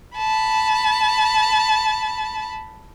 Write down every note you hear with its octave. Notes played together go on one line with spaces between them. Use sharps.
A5 B5